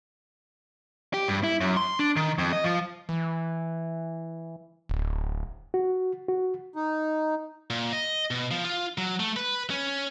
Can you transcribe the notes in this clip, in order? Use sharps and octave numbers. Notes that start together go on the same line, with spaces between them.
G4
G2
E4
F#2
C6
D4
D#3
F2
D#5
F3
E3
D1
F#4
F#4
D#4
A#2
D#5
B2
F3
F4
F#3
A3
B4
C#4